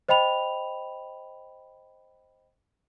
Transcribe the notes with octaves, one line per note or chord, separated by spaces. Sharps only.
C5 D#5 G5 B5 F7